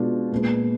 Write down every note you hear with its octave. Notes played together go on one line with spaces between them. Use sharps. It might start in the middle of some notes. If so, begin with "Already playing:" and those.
Already playing: B2 G#3 D4 F4
A#2 G#3 B3